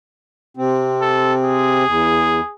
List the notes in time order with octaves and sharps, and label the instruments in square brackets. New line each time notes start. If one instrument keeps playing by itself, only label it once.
[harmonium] C3 C4
[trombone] A4
G#4
[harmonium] E2